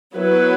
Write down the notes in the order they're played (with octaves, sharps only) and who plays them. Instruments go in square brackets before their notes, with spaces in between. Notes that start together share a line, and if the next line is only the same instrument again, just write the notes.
[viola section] F#3 B3 E4 B4